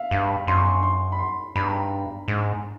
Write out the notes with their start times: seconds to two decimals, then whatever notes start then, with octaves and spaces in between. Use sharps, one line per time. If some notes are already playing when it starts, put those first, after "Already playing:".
Already playing: E5 F5
0.11 G2 F5
0.29 B5
0.47 F#2 C6
0.57 C#6
0.65 C6
0.83 C6
1.12 B5
1.19 C6
1.56 G2 B5
1.65 A#5
1.74 B5
2.28 G#2